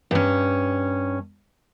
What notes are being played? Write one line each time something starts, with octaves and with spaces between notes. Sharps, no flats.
G2 C#4